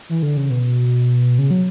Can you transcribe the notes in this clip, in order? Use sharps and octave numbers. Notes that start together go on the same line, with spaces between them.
E3
D3
C#3
B2
C#3
F#3